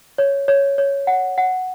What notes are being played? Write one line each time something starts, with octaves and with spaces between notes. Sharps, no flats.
C#5
C#5
C#5
F#5
F#5